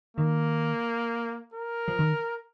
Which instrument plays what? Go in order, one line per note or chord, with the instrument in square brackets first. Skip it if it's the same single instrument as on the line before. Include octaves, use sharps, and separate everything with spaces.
[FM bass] D#3 [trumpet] A#3
[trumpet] A#4
[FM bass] F3
D#3